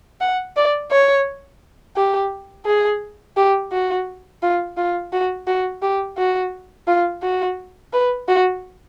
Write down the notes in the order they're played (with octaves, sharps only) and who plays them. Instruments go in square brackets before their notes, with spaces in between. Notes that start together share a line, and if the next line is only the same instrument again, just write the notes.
[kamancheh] F#5
D5
C#5
G4
G#4
G4
F#4
F4
F4
F#4
F#4
G4
F#4
F4
F#4
B4
F#4